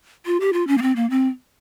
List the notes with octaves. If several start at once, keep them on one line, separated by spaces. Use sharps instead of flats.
F4
G4
F4
C#4
A#3
C4
A#3
C4